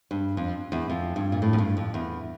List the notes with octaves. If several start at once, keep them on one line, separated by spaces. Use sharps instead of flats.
G2
F2
E2
F2
G2
A#2
A2
F2
G2
F2
E2